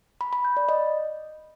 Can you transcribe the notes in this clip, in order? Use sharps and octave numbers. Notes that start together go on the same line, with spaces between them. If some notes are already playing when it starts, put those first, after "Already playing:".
B5
B5
G6
D5
D#5